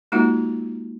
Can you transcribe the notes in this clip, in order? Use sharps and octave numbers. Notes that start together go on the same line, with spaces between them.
G#3 A#3 D#4 F4 F#4 F#5